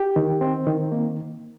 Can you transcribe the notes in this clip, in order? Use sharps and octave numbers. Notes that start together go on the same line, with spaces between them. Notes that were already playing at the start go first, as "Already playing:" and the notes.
Already playing: G4
D#3
C4
D#3
A#3